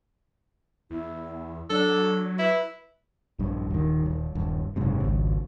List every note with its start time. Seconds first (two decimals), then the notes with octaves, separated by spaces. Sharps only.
0.91 E2 E4
1.70 F#3 D4 A4
2.39 E4 B4
3.39 A#1 G2
3.70 D#1 D#3
4.06 D#1
4.35 D#1 G2
4.76 F#1 G#2 C3
5.00 G#1 C#2